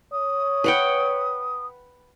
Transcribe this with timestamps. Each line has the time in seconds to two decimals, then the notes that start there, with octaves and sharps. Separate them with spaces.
0.12 C#5 D#6
0.64 B4 F#5 G5